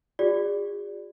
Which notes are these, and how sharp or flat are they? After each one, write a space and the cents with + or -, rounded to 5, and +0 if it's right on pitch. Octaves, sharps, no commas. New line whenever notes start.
F4 +45 G#4 -35 D5 +0